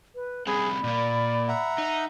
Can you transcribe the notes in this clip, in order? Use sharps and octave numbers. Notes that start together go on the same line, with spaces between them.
B4
G3 C4 G#4 F#5 B5
A#2 A#3 D5
E5 F#5 A#5
D#4